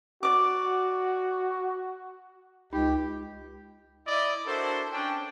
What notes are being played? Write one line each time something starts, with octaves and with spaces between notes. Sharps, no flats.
F#4 D5 D6
C#2 D#4 G4
E4 D5 D#5
D4 E4 F#4 A4 A#4 C5
C#4 D4 G5